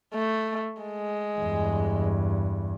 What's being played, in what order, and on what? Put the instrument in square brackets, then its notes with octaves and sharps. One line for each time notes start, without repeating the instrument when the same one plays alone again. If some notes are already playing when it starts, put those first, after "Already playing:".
[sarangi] A3
G#3
[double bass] E2 G2